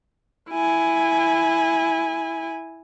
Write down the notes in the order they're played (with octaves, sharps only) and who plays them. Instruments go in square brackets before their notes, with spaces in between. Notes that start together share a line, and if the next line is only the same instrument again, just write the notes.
[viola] E4 G#5